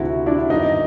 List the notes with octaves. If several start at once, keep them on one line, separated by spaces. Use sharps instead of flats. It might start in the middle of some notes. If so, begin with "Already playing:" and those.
Already playing: D2 C3 F3 E4 F#4
D4 E4
E4
G1 F#2 D#3 D#4